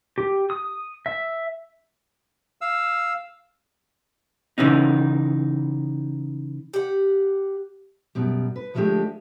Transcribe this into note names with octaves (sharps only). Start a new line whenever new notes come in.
G4
D#6
E5
F5 E6
C#3 E3 C#4 D#4
G4 F#5
F#2 B2 G3
B4
D2 F3 G#3 A3 D4 G4